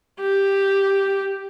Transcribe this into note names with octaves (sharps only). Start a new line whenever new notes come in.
G4